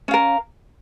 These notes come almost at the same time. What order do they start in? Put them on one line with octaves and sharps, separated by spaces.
C#4 F5 A#4